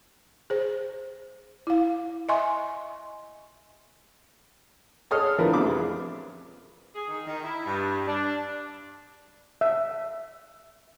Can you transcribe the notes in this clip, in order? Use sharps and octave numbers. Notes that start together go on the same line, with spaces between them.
G#4 C5
E4 F5
D#5 E5 G#5 C6 C#6
G#4 A4 C#5 D#5 D#6 F6
A2 D3 F3 A#4 B4
A1 F2 D6
G#4
G#4
D#3
D#3
E4
G2
D4
E5